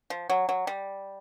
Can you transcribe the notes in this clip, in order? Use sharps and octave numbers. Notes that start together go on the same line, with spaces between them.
F3
F#3
F#3
G3